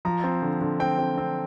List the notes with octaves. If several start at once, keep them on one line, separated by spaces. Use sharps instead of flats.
F3 A#5
C4
D3
D3
C4 G5
C4
C4